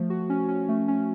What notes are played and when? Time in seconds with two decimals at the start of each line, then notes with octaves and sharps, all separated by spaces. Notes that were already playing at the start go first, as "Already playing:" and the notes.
Already playing: F3 A3
0.10 F#4
0.30 C#4
0.49 C#4
0.69 A3
0.88 C#4